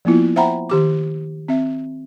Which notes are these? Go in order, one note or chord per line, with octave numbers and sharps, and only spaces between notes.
F3 A#3 B3 E4 F4
C5 E5 F#5 G5 A#5 B5
D#3 G4 D6
C4 E5